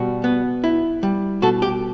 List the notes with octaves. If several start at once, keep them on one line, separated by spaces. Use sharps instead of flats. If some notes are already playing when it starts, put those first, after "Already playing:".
Already playing: B2 G3 F#4
B3
E4
G3
B2 F#4 A4
G4